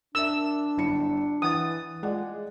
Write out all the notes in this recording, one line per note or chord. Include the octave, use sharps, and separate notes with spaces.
D4 A#4 E5 E6
G1 E4 C#7
E3 F#5 D#6 A6
G#3 F4 D5 F#5